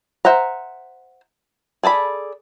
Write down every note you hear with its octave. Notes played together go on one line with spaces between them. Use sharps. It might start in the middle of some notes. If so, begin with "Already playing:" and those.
C5 E5 F#5 A#5
G#4 A4 D5 B5